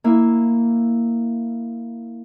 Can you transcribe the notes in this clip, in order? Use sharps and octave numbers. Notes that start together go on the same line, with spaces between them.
A#3 E4